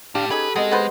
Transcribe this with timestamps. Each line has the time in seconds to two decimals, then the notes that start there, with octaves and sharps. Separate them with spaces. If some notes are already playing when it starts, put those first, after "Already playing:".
0.15 A2 D4 G4 F5
0.31 C#4 D#4 G#4 A4 B4
0.56 G#3 B3 C4 D#5
0.72 B3 B4 C5